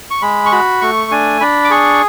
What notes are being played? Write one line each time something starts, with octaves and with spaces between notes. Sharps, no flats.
C#6
G#3 B5
C#6
F#4 B5
A3 C#6
D4 G#5
D4 B5
D6
G#4 C#6